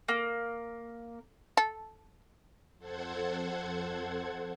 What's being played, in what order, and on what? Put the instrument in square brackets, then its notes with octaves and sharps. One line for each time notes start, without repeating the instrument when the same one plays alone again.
[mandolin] A#3
[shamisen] A4
[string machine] F2 A4 C5 F#5 G#6